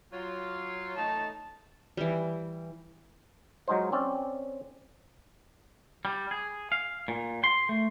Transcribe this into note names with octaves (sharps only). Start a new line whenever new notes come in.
F#3 F4 C#5
A3 D#4 A5
E3 G3
F#3 G#3 D#4 F4 C5
C4 C#4 D5
G3
G#4
F5
A#2
C6
A3